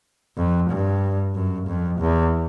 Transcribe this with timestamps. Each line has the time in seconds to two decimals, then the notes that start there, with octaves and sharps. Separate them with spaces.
0.37 F2
0.70 G2
1.35 F#2
1.68 F2
2.00 E2